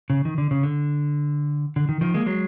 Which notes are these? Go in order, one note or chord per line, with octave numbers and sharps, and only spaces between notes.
C#3
D#3
D3
C#3
D3
D3
D#3
D#3 F3
G#3 A#3
F#3 G#3